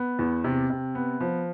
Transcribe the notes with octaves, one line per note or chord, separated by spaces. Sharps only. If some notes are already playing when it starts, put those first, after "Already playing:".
Already playing: B3
E2
C3
C3
B3
F3